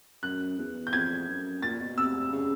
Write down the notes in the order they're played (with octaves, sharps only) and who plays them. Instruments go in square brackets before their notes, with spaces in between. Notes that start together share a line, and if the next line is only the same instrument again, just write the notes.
[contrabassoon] F#2 [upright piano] F#6
[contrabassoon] E2
[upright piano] G6
[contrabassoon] F2 [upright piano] G#6
[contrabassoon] F#2
[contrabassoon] A#2 [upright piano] A6
[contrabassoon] B2
[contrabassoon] C3 [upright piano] E6
[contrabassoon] C#3